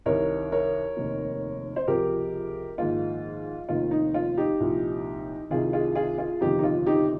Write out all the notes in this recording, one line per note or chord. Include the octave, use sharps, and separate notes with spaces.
C2 C3 D#3 A#4 C#5
A#4 C#5
F1 D#2 D#3
C5
C#2 C3 F3 G4 A#4
A#1 G#2 D#3 F4
F1 D#2 D#3 F4
D#4
F4
D#4 G4
C2 A#2 F3
C2 C3 D#3 F4 G#4
F4 G#4
F4 G#4
F4 G#4
G1 F2 C3 D#3 D#4 G4
D#4
F4
D#4 G4